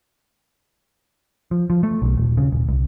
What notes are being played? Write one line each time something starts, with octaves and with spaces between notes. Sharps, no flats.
F3
F3
A3
B1
D#1
C#3
D#1
C2